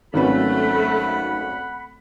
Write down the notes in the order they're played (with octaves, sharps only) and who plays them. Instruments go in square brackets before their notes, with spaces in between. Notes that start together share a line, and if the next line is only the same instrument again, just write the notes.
[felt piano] G#1 C#4 B4 [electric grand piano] D#3 F#3 [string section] A3 [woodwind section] F#5 B5